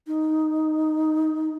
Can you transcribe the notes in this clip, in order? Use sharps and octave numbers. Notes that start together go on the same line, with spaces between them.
D#4